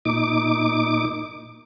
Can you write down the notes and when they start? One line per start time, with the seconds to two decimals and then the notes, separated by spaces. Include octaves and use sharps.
0.05 A#2 D#4 D6